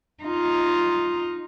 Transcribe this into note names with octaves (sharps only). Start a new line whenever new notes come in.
D#4 F4